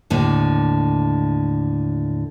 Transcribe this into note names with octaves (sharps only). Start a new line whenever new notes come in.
D#2 A2 D3